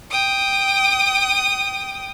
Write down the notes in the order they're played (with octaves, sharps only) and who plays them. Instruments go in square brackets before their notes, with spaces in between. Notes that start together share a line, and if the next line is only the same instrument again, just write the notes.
[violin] G5 D#6